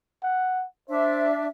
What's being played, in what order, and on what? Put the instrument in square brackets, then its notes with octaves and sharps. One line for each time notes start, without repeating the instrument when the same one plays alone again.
[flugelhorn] F#5
[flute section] D4 E5 [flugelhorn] C5